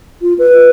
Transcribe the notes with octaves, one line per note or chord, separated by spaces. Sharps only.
F4
B4